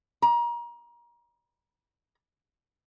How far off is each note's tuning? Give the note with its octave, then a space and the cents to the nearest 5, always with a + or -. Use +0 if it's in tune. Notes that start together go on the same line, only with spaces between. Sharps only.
A#5 +30